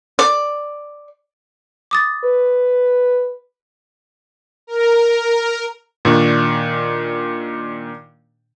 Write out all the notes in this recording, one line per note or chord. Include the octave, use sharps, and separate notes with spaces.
D5
D6 D#6 A6
B4
A#4
A#2 D#3 D4 C#6